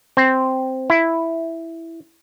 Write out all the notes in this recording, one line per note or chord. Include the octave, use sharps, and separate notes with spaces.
C4
E4